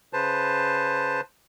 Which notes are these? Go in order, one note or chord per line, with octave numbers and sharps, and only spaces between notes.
C#3 B4 C5 A5